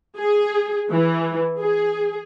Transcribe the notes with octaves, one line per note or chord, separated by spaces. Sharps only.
G#4
E3
G#4